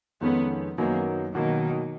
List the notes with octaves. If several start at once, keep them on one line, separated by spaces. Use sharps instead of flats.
F2 D#3 G#3 B3 C#4
F#2 D#3 F#3 A#3 B3 D#4
B2 D#3 F#3 A#3